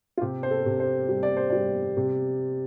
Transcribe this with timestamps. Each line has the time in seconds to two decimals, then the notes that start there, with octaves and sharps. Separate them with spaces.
0.17 F4
0.21 C3 G4
0.43 C5
0.51 A4
0.66 C3
0.80 C5
1.09 G3
1.23 D5
1.37 C5
1.50 G3 D5
1.97 C3